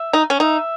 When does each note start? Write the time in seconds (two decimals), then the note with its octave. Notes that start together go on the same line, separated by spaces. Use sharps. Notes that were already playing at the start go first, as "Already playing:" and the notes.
Already playing: E5
0.13 D#4
0.30 C#4
0.40 D#4 E5